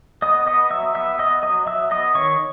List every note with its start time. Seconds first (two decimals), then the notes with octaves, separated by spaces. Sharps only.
0.22 B3 D#5 D#6
0.47 B3 D#5 D#6
0.70 F#3 E5 E6
0.95 B3 E5 E6
1.19 B3 D#5 D#6
1.43 F#3 D#5 D#6
1.67 F#3 E5 E6
1.91 B3 D#5 D#6
2.15 D#3 C#5 C#6